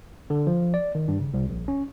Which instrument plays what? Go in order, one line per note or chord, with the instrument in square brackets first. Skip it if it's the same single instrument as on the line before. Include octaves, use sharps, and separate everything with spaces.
[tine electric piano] D3
F3
D5
D#3
G2
C#3
C2
A#1
C#4